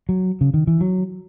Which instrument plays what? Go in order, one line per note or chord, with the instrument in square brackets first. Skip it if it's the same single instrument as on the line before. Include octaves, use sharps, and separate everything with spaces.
[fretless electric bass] F#3
C#3
D#3
E3
F#3